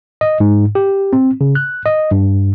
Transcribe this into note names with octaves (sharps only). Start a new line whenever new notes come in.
D#5
G#2
G4
C4
C#3
F#6
D#5
G2